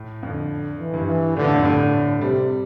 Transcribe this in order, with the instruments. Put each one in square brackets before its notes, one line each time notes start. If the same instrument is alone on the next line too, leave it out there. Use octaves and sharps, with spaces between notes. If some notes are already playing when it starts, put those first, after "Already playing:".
Already playing: [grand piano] A2
[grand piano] F2 [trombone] D3
[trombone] E3
[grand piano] G2
[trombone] E3
[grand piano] A2 [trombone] D3
[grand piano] F2
G2 B2
[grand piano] A2 [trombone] D3
[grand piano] A2
[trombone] C3 [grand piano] G3